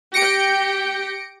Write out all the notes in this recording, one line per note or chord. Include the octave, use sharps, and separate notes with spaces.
G4 G5 A#6 C#7 D7